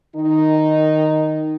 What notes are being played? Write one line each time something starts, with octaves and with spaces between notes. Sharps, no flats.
D#3 D#4